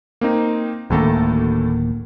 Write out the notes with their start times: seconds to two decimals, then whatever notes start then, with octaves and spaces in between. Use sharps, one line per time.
0.21 A#3 C4 D#4
0.90 D1 D2 D#3 A3 A#3 A4